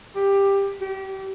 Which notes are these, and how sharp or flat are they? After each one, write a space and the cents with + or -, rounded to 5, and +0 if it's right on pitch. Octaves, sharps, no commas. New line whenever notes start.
G4 +10
G4 -30